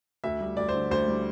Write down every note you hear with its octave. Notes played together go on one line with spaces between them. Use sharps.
D2 E5
G3
D2 D5
C5
D3
D2 C5
G3